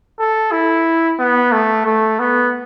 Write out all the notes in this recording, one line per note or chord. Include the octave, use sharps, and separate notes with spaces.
A4
E4
B3
A3
A3
B3